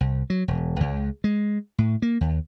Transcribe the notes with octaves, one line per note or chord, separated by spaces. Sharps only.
C2
F#3
E1
C#2
G#3
A2
A#3
D#2